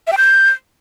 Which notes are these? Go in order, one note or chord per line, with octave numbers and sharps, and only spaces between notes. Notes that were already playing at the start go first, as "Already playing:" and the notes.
E5
G5
G6